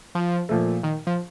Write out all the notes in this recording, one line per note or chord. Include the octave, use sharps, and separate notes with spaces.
F3
A#2 F3 A3
D#3
F3